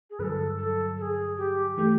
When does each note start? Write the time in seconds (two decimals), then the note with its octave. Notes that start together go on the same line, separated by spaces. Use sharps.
0.10 G#4
0.19 G2 D3 F#3 A4 B4
0.58 A4
0.98 A4
1.02 G#4
1.38 G4
1.77 E3 A3 G4